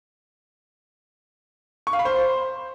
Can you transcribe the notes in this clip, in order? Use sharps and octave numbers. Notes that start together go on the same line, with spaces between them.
C#6
F5
B5
C5